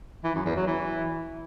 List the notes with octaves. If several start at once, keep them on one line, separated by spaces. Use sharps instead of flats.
E3
F#2
E2
F#3
E3